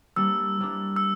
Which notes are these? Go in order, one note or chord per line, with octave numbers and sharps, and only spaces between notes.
G3 A#3 D4 E6
G3 A#3 D4
E6